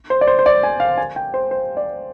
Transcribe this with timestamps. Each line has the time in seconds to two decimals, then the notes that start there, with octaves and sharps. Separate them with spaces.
0.10 C5
0.21 D5
0.27 C5
0.39 C5
0.46 D5
0.63 G#5
0.80 F5
0.98 G#5
1.16 G5
1.34 C5
1.51 C5
1.77 D5